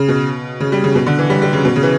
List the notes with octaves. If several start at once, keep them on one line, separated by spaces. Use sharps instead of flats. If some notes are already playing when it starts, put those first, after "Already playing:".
Already playing: C#3
B2
C#3
G3
C#3
B2
D3
E3
G3
G3
C#3
B2
C#3
E3